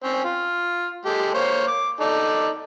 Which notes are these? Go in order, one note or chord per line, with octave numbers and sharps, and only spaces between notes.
C4 C#4
F4
G#3 G4 A4
A#3 C5 C#5
D6
D#4 A4 D5